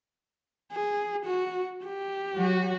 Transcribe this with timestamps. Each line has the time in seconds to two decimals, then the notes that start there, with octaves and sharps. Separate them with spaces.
0.72 G#4
1.26 F#4
1.85 G4
2.35 F#3 F#4